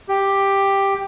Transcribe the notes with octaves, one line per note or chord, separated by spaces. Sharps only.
G4